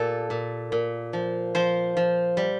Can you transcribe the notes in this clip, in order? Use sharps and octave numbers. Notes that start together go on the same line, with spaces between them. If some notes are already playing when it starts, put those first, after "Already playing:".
Already playing: A#2 G4 A4
A#2
A#2
F3
F3 C5
F3
G3